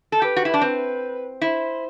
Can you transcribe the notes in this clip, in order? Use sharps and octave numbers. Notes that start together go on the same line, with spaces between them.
A4
G4 B4
F#4
E4
D4
C4 B4
E4 C5